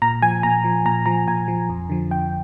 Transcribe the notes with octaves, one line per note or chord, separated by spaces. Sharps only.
A#2 A#5
F3 G#5
A#2 A#5
F3
A#2 A#5
F3 A#5
A#2 G#5
F3
F2
D3 F3
F2 G5